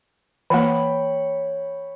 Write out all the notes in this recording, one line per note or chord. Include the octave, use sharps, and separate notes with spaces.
E3 A#3 C#5 G5 B5